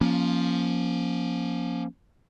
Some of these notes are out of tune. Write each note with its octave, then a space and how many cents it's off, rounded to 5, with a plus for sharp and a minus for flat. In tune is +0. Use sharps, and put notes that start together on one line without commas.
F3 +0 A#3 +30 C#4 +0